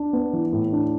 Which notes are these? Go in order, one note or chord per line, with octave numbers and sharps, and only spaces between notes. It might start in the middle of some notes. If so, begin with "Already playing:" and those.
Already playing: D4
B3
E3
A2
D4